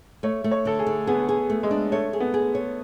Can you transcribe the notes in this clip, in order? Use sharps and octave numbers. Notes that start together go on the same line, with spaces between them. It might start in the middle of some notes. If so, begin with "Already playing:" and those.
A3 C#5
A3
C#5
D3 A4
G#4
D3
B3 G#4
G#4
A3
G#3
D4
A3 C#5
G#4
B3
G#4
C#5